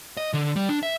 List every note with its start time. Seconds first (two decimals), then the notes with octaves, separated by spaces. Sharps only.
0.17 D#5
0.33 D3
0.56 G3
0.69 D4
0.83 E5